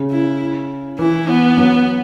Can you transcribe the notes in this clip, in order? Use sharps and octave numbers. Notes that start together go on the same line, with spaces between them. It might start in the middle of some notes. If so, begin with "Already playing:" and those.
Already playing: C#3
E4
E3 E4
B3
F#3